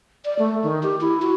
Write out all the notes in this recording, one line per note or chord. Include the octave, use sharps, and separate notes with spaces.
D5
A3
D#3
G4
E4
F#4